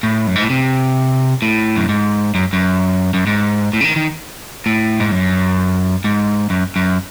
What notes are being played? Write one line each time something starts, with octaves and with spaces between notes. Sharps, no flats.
A2
F#2
G#2
A2
C3
A2
F#2
G#2
F#2
F#2
F#2
G#2
A2
C#3
D#3
D#3
A2
G#2
F#2
G#2
F#2
F#2